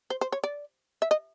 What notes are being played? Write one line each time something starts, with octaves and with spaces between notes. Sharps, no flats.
C5
C5
C#5
D5
E5
D#5